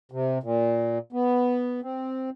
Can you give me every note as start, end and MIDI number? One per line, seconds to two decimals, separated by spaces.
0.12 0.38 48
0.43 0.98 46
1.12 1.80 59
1.83 2.30 60